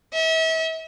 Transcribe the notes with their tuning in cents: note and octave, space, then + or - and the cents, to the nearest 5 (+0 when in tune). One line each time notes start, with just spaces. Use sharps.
E5 -35